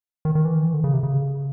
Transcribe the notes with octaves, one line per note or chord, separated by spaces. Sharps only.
D#3
D#3
E3
D#3
E3
D3
C#3
C3
C#3